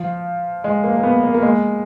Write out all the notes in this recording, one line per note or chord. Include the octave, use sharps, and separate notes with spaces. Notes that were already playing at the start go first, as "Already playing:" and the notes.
Already playing: F3
G#3
A#3
A#3
B3
A#3
A#3
G#3